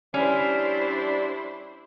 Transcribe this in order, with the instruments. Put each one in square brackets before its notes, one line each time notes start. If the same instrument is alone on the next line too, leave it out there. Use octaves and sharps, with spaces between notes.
[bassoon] G3 [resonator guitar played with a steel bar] C#4 [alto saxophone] D4 [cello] E4 C5